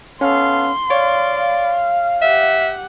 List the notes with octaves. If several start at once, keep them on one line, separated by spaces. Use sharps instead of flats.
B3 C#4 A4 F5 C6
C#5 D5 F5
G4 E5 F#5